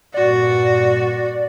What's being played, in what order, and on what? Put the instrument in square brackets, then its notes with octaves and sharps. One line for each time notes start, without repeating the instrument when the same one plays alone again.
[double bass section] G2 A#2 [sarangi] F#4 [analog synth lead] D5